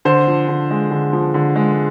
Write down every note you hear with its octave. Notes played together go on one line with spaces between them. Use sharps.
D3 C5
F3
D3
G#3
D3
F3
D3
G#3